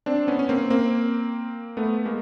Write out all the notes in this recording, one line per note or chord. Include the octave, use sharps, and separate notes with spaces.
C4 D4
B3 C#4
C#4
A#3 C4
A#3 C4
A3 B3
G#3 A#3